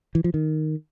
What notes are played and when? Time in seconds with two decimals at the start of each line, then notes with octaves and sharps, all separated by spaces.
0.15 E3
0.24 F3
0.34 D#3